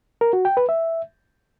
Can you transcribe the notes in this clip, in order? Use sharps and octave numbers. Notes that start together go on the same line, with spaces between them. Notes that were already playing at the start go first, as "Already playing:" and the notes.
A#4
F#4
G5
B4
E5